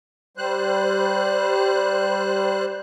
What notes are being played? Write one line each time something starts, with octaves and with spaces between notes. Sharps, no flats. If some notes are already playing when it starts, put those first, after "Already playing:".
G3 C5 F#6